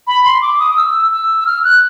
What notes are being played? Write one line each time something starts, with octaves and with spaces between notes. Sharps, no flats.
B5
C6
D6
D#6
D#6
E6
E6
E6
F6
F#6